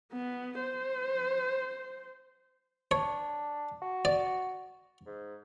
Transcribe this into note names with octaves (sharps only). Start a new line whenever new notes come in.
B3
C5
D4 C#5
F#4
D5
G#2